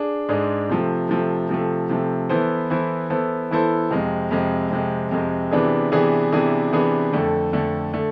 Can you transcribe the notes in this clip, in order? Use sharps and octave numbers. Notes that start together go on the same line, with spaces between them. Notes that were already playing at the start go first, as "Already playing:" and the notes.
Already playing: D4 G#4
G#2 G#3 D4 G#4
C3 F3 A3
C3 F3 A3
C3 F3 A3
C3 F3 A3
E3 B3 E4 A4 C5
E3 B3 E4 A4 C5
E3 B3 E4 A4 C5
E3 B3 E4 A4 C5
F2 C3 G#3
F2 C3 G#3
F2 C3 G#3
F2 C3 G#3
C3 E3 B3 D4 G#4
C3 E3 B3 D4 G#4
C3 E3 B3 D4 G#4
C3 E3 B3 D4 G#4
F2 D3 A3
F2 D3 A3
D3 A3